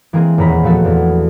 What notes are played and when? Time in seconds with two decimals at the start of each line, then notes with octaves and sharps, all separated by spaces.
0.13 E3 G#3 A#3 C4 G#4
0.38 D#1 E2 A#5 B5 B6
0.63 A#2 F3 A3 B3 F#4 A4
0.85 E2